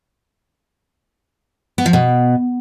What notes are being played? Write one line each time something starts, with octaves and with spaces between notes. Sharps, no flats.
B3
F3
B2